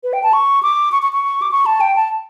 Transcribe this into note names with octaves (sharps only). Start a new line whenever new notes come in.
B4
G5
A5
C#6
D6
C#6
C#6
C#6
D6
C#6
A5
G5
A5